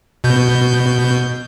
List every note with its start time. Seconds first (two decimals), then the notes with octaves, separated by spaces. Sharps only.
0.24 B2 G6